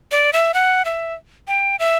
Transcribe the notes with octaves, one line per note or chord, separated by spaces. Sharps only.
D5
E5
F#5
E5
G5
E5